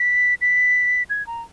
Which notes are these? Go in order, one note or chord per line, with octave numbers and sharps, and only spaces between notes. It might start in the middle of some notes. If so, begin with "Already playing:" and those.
Already playing: B6
B6
G#6
A#5